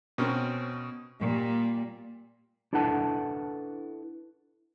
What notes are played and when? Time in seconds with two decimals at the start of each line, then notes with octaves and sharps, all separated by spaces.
0.18 B2 C4 C#4 A#4
1.20 A#2 G3
2.73 D4 E4 A4 B4 F#5 A5